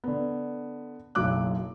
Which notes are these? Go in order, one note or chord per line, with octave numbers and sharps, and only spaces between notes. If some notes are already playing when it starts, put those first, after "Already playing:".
D3 B3
F#1 B1 F#3 D6 F#6